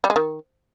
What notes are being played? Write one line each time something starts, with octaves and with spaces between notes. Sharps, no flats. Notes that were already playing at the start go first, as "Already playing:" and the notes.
G3
G#3
D#3